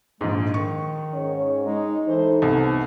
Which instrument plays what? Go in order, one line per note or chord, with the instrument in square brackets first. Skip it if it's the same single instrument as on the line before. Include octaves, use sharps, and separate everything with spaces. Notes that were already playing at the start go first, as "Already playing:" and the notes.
[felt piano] A#1 G#2 [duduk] G#3
[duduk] D#3 [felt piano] C#6
[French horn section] G#2 C#4 C#5
[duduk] G#3 [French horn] D#4
[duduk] E3 [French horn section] D#4 A4 [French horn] C5
[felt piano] C2 [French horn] B3